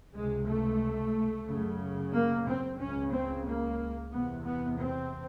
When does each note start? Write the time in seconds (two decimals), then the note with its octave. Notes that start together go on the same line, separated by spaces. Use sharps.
0.15 C#2 C3 G#3
0.47 A3
1.48 F#2 C#3
2.13 A#3
2.47 C4
2.79 C#2 C#3 C#4
3.12 C4
3.46 A#3
4.12 E2 C3 B3
4.45 B3
4.79 C4